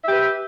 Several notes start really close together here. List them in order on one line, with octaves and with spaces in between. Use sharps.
E5 G4 B4